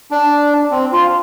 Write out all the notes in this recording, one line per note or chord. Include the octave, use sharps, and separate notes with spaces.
D4
C4
F4